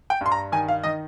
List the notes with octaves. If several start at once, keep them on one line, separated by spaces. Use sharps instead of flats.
G5
G2 C6
A#5
D#3 G#5
F5
D#3 D#5